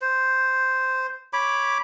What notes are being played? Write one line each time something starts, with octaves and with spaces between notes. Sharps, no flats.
C5
C#5 B5 D6